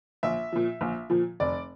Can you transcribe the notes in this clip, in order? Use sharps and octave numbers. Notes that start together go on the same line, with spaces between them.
A#1 E5
A#2 F3
A#1
A#2 F3
F1 D5